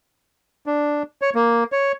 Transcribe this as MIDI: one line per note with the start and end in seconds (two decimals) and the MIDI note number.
0.66 1.03 62
1.22 1.30 73
1.35 1.64 58
1.72 1.92 73